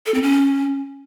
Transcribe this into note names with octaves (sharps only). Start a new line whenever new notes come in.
A4
C4
C#4